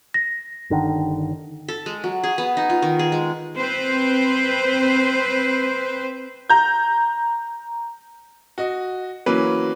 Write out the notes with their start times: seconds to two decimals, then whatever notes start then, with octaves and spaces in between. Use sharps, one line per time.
0.14 A#6
0.70 G1 D3 D#3
1.68 A4
1.86 G#3
2.04 F#3
2.24 G#4
2.38 B3
2.57 D#4
2.70 F4
2.82 D#3
2.99 G#4
3.12 G#3
3.58 C4 B4 C5
6.50 A#5 G6
8.58 F#4 D#5
9.26 E3 F#3 A#3 C#4 B4